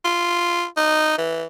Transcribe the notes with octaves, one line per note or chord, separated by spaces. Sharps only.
F4
D#4
E3